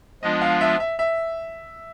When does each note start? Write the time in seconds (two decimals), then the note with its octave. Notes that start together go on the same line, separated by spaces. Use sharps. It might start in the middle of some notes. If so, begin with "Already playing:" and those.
0.22 F3 G#3 B3 D4 F4 D#5
0.41 F5
0.61 E5
0.80 E5
0.99 E5